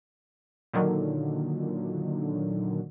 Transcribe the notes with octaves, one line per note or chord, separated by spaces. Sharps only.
A#2 D3 D#3 F#3